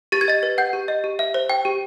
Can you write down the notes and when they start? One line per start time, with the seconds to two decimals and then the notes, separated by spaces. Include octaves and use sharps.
0.12 G4 A6
0.21 G#6
0.28 D#5 A6
0.43 B4
0.58 F#5 G6
0.73 G4
0.88 D#5
1.04 G4
1.19 E5
1.34 C5
1.50 G5
1.65 G4